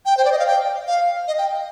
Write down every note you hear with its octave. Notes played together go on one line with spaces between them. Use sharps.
G5
C5
D5
D#5
F5
G5
F5
D#5
G5